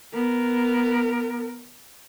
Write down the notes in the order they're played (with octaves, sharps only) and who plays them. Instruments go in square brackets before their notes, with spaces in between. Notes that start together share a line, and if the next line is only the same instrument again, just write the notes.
[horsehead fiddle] B3 A#4